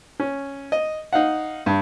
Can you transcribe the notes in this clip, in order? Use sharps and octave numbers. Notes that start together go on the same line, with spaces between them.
C#4
D#5
D#4 F5 F#5
G2